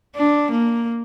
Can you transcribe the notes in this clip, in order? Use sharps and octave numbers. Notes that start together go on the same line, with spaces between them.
D4
A#3